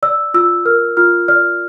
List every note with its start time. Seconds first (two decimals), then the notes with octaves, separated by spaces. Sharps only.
0.03 D5 E6
0.34 F4 E6
0.65 A#4 F6
0.97 F4 F6
1.28 D5 F6